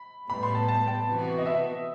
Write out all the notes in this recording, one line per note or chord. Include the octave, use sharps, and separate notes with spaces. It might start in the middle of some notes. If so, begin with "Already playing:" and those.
Already playing: B5
A2 G3 B3 B5
C6
A5
A5
G5
C3 E3 B3 F#4
D#5
E5